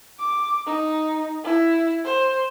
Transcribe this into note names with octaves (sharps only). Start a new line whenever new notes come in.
D6
D#4
E4
C5